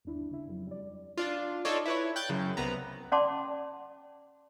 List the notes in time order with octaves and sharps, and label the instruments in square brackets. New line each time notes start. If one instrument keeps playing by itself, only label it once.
[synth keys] G1 D#2 D4 E4
G1 C#3 E4
F2 F#3
G3 D5
D4 F4
D#4 F4 A4 C#5 D5
E4 B4 C#5
G5 F#6 G6 A6
F#2 C#3
C2 B3 A#5
[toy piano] C#4 D5 F#5 A5 C6 D6